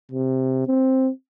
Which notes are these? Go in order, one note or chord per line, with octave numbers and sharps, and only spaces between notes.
C3
C4